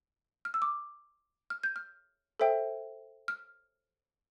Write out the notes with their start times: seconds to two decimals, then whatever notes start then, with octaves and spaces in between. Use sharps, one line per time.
0.45 F6
0.54 E6
0.62 D6
1.50 F6
1.63 G6
1.76 F6
2.40 A4 C5 E5 G5
3.28 F6